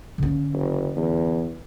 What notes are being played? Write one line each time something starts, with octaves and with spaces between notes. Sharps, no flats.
D3 C#4
F#1
E2